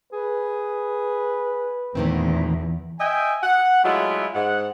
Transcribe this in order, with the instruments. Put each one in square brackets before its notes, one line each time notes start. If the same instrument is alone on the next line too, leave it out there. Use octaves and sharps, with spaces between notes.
[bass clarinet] G#4 [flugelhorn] B4
[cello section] E2 [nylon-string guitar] A#2 D#3 C4 [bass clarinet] A3
[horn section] D#5 E5 G5 G#5
F#5
F#3 G#3 A3 E4 F4
G#2 F#5